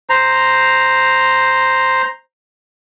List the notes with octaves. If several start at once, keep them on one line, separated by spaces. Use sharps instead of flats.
C5 A#5